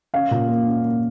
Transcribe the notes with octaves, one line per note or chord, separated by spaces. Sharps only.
C#4 F5
A#2
A#3
C#4
A#3